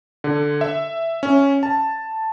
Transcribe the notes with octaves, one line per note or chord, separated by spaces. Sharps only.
D3
E5
C#4
A5